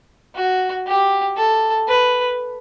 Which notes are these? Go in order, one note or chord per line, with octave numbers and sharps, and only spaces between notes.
F#4
G4
A4
B4